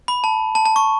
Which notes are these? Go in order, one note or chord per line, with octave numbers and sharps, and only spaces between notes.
B5
A5
A5
A5
C#6